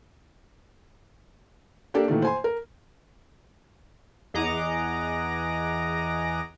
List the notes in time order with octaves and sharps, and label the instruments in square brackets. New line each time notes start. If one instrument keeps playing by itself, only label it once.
[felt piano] A#3 D4 G4 A4 D5
A#2 D#3 E3 A3
C5 G#5 C6
A#4
[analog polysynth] E2 G#4 D#5 F#5 A#5 D6